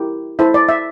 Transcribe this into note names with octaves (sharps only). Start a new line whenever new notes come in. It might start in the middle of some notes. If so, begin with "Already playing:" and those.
Already playing: E4 G4 A#4
E4 A4 C5 E5
D5
E5